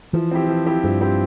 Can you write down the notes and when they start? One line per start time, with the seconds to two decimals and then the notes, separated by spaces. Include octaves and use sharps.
0.13 E3 F3
0.31 C4 E4 G4
0.49 F3
0.66 C4 E4 G4
0.84 G2 F3
1.01 C4 E4 G4